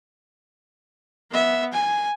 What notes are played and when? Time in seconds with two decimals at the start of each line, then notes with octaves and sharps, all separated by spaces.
1.32 B3 E5
1.73 G#5